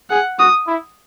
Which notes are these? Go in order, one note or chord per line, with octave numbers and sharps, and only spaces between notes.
G#4 F#5
F#4 D#6
E4